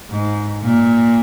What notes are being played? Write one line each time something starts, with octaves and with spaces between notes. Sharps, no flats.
G#2
A#2